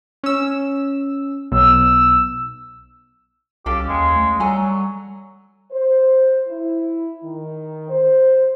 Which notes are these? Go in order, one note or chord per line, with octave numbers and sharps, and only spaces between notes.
C#4 E6
B1 E6
C2 C#4 G4 A4 F5
D#2 G#3
A3
F#3 G3 A4 G#5 A#5
C5
E4
D#3
C5